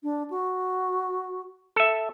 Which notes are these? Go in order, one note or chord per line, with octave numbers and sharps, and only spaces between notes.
D4
F#4
A4 E5